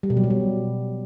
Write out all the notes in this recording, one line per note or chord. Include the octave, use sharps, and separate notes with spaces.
G3
B2
F#3
B2
G3